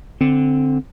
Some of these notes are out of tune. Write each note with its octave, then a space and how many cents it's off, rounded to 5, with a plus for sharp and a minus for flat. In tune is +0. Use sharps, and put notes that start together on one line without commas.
D3 -5 C4 +0